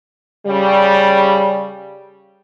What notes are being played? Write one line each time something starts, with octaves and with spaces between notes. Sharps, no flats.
C#3 G3